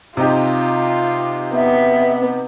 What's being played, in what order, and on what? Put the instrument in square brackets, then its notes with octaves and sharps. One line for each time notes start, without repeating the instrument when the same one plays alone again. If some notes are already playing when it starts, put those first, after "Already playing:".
[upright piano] C3 D#4 G4 [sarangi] F4
[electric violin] B3 [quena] E5